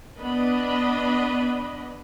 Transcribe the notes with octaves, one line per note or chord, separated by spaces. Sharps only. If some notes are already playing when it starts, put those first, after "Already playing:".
B3 D4 B4 D#5 B5